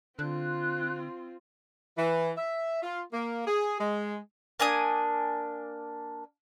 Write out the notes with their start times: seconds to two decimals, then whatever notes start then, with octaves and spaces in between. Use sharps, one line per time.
0.19 D3 C4 F4 F#6
1.98 E3
2.37 E5
2.83 F4
3.13 A#3
3.47 G#4
3.80 G#3
4.60 A#3 D4 G#5 D#6